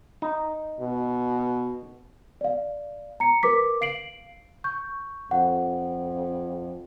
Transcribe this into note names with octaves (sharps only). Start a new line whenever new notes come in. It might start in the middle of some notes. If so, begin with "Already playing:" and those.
D#4
B2
D5 F5
A#5 C#7
A#4 B4 D6 B6
F5 C7 D7 F#7
C#6 G6
F2 F#5